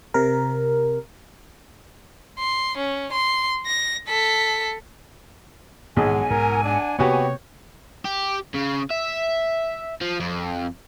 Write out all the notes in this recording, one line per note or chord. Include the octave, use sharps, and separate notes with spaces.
C3 A#4
C6
C#4
C6
A#6
A4 B6
B1 G#2 D#3 E3 G#3 G#4 F#5 G#5
G#2 A#4
D4
C3 A#3 B3 F#4 G4 C#5
G4
C#3
E5
F3
F2